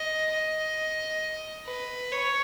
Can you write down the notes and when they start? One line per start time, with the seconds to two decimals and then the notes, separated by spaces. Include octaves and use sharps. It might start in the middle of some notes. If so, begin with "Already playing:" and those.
Already playing: D#5
0.32 D#5
1.67 B4
2.12 C#5